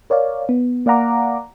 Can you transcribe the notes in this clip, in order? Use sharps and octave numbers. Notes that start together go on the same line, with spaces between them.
A#4 C#5 D5 F5
B3
A#3 D5 F5 F#5 A#5 D6